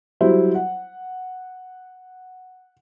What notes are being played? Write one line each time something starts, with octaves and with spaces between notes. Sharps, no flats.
F#3 G3 E4 C5
F#5